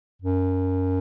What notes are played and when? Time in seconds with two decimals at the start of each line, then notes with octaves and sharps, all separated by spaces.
0.22 F#2